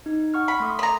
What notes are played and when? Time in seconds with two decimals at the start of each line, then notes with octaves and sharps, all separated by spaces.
0.06 D#4
0.34 F#5 C#6 F6
0.48 B5
0.60 A3 C6 D#6
0.79 A#5 B5 D#6